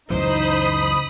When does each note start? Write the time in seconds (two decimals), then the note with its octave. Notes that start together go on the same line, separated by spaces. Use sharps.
0.10 C#2 F#2 E3 D#4 C5 B5 D#6